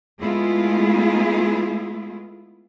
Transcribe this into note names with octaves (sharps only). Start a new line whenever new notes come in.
G#3 A3 B3 E4 F4 G#4